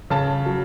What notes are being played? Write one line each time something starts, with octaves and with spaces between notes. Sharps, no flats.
C#3 A5
F#3